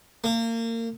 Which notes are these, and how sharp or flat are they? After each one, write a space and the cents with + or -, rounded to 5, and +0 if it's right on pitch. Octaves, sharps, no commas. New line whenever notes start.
A#3 -30